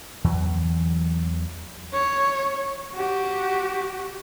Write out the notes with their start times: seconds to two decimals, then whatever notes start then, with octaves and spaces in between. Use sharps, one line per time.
0.24 E2 E3 F#3
1.93 C#5
2.96 F#4 G4